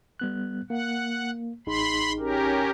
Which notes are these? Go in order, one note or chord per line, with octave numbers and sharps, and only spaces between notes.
G3 B3 F#6
A#3 F#5
A1 D#4 G#4 B5 C6
C#4 G4 A#4